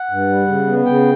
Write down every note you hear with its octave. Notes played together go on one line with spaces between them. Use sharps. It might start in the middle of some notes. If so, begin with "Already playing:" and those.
Already playing: F#5
G2
G3
C#3
B3
C#3 G5